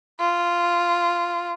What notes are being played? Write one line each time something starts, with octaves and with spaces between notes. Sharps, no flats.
F4